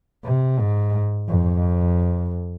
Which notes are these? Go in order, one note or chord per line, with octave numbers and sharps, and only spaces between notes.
C3
G#2
F2